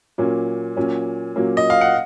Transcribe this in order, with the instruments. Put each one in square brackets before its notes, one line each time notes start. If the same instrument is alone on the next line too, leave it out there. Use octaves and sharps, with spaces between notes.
[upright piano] A#2 F#3 A#3 C#4
A#2 F#3 A#3 C#4
A#2 F#3 A#3 C#4
[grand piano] D#5
F5
F#5